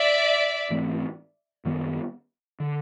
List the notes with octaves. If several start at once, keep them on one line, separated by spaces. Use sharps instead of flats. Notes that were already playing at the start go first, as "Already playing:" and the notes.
Already playing: D5 E5
G#2 E3 A3 C4
F#2 D#3 G3 B3
D3